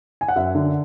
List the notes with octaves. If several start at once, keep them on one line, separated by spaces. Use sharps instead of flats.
G#5
F#5
F#2 E5
D3